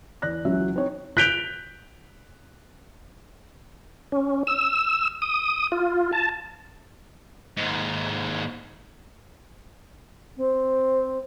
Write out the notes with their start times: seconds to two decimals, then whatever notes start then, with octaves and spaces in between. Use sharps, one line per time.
0.22 E2 D5 F#6 A#6
0.45 C#2 C#3 E3 F#3 F#4 E5
0.76 C4 D#4 C#5
1.17 F#6 G6 B6 D7 F7 G7
4.12 C#4
4.47 E6
5.22 D#6
5.72 F4
6.13 A5
7.57 D#2 G#2
10.37 C4